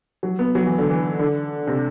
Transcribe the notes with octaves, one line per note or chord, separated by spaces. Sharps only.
F#3
B3
F#3
E3
D3
E3
D3
C3